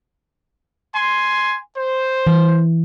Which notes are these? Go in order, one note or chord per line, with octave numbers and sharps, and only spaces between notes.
G#5 C6
C5
E3